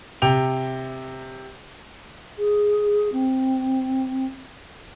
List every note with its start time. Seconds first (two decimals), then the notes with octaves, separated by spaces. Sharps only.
0.22 C3 G5 F7
2.38 G#4
3.12 C4